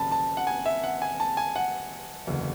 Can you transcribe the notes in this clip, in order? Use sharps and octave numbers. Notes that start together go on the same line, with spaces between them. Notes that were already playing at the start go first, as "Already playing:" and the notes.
Already playing: G#1 F#2 C#3 A5 B5
A5
F#5
G#5
E5
F#5
G#5
A5
G#5
F#5
F#1 E2 D3